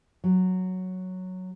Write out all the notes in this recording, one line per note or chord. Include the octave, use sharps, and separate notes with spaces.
F#3